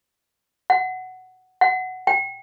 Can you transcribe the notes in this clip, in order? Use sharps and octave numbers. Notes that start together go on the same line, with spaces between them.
F#5
F#5
G5